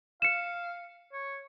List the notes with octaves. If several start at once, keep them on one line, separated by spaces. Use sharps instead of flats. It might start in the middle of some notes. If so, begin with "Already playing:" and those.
F5 C#7 E7
C#5